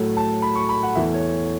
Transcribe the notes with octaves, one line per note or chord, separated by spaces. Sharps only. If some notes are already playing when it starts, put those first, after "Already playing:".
Already playing: A2 F#3 A3
A5
B5
C#6
B5
F#5
E2 E3 A3 E5
C#5